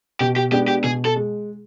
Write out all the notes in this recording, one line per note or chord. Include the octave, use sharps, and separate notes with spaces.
B2 G4
G4
G#3 B3 D4 G4
G4
B2 G#4
A4
G#3